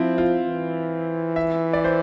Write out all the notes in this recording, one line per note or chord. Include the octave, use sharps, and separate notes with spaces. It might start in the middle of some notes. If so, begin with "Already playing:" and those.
Already playing: F3 C4 E4
F4
E3
E5
D5
C5